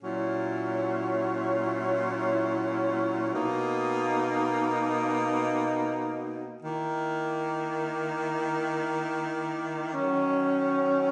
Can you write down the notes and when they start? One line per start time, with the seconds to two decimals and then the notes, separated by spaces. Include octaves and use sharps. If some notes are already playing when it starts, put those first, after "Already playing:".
0.02 A#2 F#3 C#4 E4
3.33 B2 A#3 D#4
6.63 D#3 A#3 E4
9.94 D#3 F#3 C#4